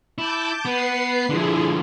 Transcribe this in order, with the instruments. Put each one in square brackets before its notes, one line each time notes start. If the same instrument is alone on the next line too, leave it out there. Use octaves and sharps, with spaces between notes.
[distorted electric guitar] E4 [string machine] A5 D6 G6
[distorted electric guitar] B3 [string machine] B4 C7
[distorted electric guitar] D3 F3 [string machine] E4 G#4